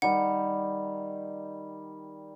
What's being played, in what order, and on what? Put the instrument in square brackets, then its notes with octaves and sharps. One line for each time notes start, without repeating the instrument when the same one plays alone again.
[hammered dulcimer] D#3 G3 [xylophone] F#5